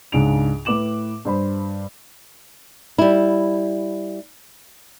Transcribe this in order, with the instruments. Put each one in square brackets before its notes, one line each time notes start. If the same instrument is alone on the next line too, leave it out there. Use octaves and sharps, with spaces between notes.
[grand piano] C#2 G#2 C#3 D4 D7 F7
A2 B4 D6 E7 F#7
G2 C5 B5
[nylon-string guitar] G3 E4